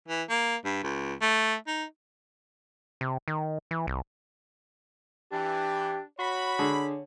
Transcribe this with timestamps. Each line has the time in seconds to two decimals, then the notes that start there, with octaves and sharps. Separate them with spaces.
0.08 E3
0.29 A#3
0.65 G2
0.83 C#2
1.21 A3
1.67 D#4
3.01 C3
3.28 D#3
3.71 E3
3.87 C2
5.32 E3 D4 G4
6.19 F#4 C#5 B5
6.59 D3 D4 G#4